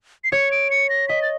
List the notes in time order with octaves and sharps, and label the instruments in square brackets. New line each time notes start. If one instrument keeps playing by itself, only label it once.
[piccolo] C7
[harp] C#5 [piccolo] C#7
[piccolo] D7
C#7
A#6
[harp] D#5 [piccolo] B6
[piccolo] A6